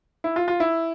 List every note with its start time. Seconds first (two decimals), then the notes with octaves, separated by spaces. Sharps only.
0.24 E4
0.36 F4
0.48 F4
0.60 E4